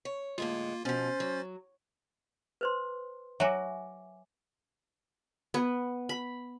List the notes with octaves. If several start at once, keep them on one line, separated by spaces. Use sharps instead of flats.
C#5
A2 D3 G#3 A#3 F4
B2 F3 C#4 C5 A6
F#3
B4 C5 C6
F#3 F#4 E5 G#5 D6
B3
B5